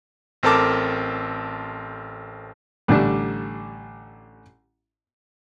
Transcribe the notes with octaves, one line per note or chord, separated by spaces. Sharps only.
A1 C4 A4 A#4 A5 D6
A1 D3 G3 D4